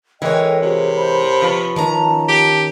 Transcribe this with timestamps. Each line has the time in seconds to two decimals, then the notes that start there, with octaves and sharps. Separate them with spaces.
0.22 E3 G#3 A4 A#4 C#5 D#5 G5
0.62 C3 F#4 G#4 C5
0.95 C5 B5
1.42 F3 B4 C#5
1.76 D#3 C#4 A5 A#5
2.28 G4